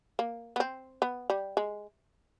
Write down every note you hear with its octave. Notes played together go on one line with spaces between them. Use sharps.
A#3
B3
C4
B3
G3
G#3